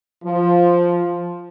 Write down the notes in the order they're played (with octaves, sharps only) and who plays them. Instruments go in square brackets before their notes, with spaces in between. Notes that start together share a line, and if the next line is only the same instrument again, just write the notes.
[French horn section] F3